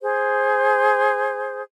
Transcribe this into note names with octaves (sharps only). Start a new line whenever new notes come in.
G#4 C5